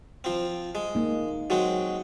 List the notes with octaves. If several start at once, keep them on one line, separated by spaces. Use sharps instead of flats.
F3 C4
G#3
A#3 D#4
F#3 G#3 C4